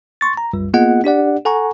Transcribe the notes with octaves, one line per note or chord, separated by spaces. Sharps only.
C6 C#6 A6
A#5
G1 C2 F#2 G3
A#3 B3 F4 G#4 D#5 F#5
D4 G4 D5 F#5
A4 F#5 G#5 A#5 C#6